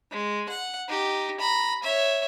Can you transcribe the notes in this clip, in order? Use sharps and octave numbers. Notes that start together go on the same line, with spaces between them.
G#3
F#5
D#4 G4
A#5 B5
C#5 E5